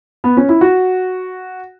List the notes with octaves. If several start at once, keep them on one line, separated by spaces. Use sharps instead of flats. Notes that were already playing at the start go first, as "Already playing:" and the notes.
B3
C#4
E4
F#4